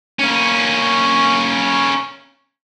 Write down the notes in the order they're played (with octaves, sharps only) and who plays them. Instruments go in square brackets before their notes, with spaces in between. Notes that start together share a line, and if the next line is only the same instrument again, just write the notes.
[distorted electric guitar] A#3 C#4